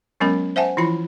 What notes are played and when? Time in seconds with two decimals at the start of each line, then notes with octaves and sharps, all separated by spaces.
0.20 F#3 G#3 B3 C#4 A#4 B5
0.56 C5 E5 F#5 G#5 A5
0.77 E3 F3 E4 F4 B5